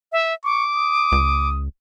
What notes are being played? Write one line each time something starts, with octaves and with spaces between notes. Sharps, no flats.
E5
C#6 D6
D#6
C#2